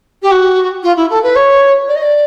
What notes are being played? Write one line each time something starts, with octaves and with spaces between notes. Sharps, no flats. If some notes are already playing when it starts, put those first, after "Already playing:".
G4
F#4
F4
E4
A4
B4
C#5
D5
D#5
D5